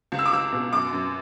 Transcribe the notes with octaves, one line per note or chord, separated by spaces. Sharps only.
C#2
E6
D6
C#2 E6
B2
F#2 D6
F#2